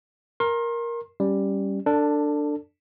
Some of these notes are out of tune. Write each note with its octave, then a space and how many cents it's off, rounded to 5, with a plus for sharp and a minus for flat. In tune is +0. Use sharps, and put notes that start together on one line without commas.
A#4 +5 C6 +35
G3 +0 C#4 +0
D4 +5 A4 +30